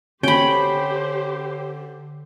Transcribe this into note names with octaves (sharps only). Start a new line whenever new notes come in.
D3 C#4 G4 C5 G5 B5